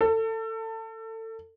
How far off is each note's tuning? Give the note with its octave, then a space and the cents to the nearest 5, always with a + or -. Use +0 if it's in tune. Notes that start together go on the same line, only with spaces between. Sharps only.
A4 +25